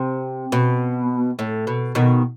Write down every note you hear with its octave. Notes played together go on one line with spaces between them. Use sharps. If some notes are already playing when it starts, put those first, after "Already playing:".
Already playing: C3
B2
A2
B2
B2 D#3